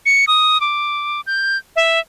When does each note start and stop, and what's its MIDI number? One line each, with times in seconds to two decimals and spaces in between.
0.06 0.25 97
0.28 0.60 87
0.61 1.21 86
1.27 1.57 91
1.76 1.99 76